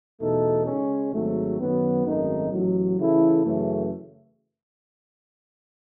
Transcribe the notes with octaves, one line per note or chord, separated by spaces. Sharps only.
E2 B2 A3 D#4 A4
C#3 G#3 C#4
G#1 G#2 F#3 A3
F#2 D#3 F#3 B3
G#1 F#2 D#3 A3 D#4
A1 A2 F#3
C#3 E3 A3 E4 A4
F#2 C#3 E3 A3